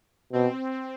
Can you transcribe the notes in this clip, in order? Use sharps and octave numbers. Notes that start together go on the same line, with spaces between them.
B2 C4